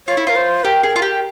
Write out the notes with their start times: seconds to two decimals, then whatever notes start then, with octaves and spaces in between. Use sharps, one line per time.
0.08 F4 C#5
0.17 E4
0.27 F4 A#4
0.36 C5
0.64 G4 A#4
0.83 G#4
0.96 F4
1.02 G4